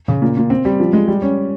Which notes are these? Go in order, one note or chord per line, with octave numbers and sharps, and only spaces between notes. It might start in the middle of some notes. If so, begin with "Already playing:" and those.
C#3
A#2
A#2
C4
G3
F3
G#3
G3
C#4